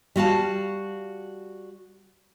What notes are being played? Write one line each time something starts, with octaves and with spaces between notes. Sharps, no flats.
G3 F#4 F5 A5